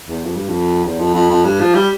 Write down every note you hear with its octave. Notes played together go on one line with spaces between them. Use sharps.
E2
F2
G2
F2
E2
F2
F2
F2
G2
F3
G3